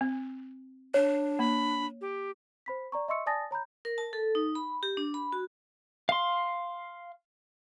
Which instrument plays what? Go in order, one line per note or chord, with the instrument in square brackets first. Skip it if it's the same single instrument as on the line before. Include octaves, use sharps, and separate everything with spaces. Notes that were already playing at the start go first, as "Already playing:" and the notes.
[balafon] C4
[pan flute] D4 [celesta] C#5
[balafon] A#3 [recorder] B5
[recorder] G4
[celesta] C5 B5 B6
D5 A#5 C#6
D#5 E5 C6 C#6 E6 C#7
D5 G#5 A5 D#6 A6 A#6
C#5 A#5 B5 G6
[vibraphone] A#4
A5
A4
D#4
B5
G4
D4
B5
F#4
[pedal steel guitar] F5 C6